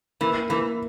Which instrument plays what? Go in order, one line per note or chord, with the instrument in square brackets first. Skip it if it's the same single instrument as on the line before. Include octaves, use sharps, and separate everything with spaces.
[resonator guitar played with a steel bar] E3 [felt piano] A#3
[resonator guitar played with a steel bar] E3 [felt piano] A#3